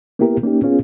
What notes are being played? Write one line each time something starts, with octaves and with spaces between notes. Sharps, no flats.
A#3 B3 E4 G4 A#4
A#3 C#4 D#4 G4
B3 C#4 F4 G#4